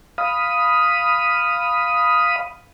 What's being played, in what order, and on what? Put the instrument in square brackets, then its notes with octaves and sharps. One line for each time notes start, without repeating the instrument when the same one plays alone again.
[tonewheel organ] F5 B5 D#6